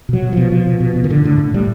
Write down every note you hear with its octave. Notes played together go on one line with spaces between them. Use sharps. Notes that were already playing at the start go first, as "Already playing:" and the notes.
B2
F#3
B2
B2 F3
B2 F3
B2
B2
B2
D#3
A2 D3
A2 D3
A2
A2 G3